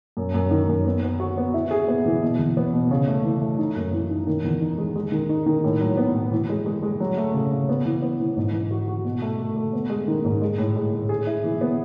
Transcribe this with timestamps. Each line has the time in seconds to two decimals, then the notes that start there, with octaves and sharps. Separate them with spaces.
0.17 F#2
0.34 F#2
0.51 D#3
0.69 F#2
0.86 B3
1.03 B3
1.20 F#4
1.37 B3
1.54 E4
1.71 G#4
1.88 B3
2.06 E3
2.22 B2
2.39 E2
2.57 B3
2.74 B2
2.91 C#3
3.08 A3
3.24 E3
3.41 A3
3.59 D#4
3.76 F#2
3.93 E3
4.10 D#4
4.27 D#3
4.44 E2
4.61 D#4
4.78 G#3
4.96 G#3
5.12 D#3
5.29 D#4
5.46 D#3
5.64 A2
5.81 F#3
5.97 B3
6.14 A2
6.31 E3
6.49 G#3
6.66 G#3
6.82 G#3
7.00 F#3
7.17 A3
7.34 C#3
7.51 C#3
7.69 B3
7.86 E3
8.02 B3
8.20 E3
8.37 G#2
8.53 E3
8.71 F#4
8.88 F#4
9.05 B2
9.22 A3
9.38 A3
9.56 A3
9.73 B3
9.90 G#3
10.08 D#3
10.24 G#2
10.42 G#3
10.58 A2
10.76 G#3
10.93 A2
11.09 G#4
11.27 E4
11.44 E3
11.61 B3